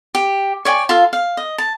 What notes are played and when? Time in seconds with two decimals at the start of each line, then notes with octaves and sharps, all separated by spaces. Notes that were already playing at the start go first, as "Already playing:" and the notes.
0.15 G4
0.65 C#5 D5 G5 G#5
0.89 F4 A4 F5
1.13 F5
1.37 D#5
1.58 A5